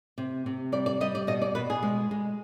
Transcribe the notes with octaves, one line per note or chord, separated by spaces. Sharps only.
C3
C3
G3 D5
D5
G3 D#5
D5
B2 D#5
D5
B2 B4
G#4
G#3
G#3